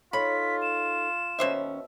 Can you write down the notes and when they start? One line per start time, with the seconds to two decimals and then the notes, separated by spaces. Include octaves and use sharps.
0.13 D#4 F4 A4 C#5 B5 B6
0.62 E7
1.39 D#2 B2 C#4 C5 E5